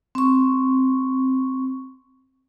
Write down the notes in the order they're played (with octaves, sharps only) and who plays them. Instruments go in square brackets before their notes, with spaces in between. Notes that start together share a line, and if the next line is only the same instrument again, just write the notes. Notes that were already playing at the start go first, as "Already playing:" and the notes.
[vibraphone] C4 C#6